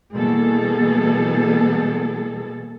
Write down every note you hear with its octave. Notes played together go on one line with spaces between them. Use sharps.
B2 E3 G3 A#3 G#4 A4